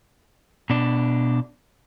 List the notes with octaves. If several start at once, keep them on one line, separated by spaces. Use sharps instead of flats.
B2 D4